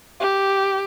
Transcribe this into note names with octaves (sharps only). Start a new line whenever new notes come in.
G4